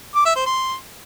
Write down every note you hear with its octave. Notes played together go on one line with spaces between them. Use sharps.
D6
E5
C5
C6